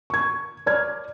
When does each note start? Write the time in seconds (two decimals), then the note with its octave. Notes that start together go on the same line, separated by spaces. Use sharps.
0.10 C#6 G#6
0.66 C#5 D5 F6 G#6